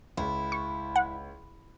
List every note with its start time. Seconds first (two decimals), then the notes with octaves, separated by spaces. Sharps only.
0.17 C#2 E4
0.52 C#6
0.96 F#5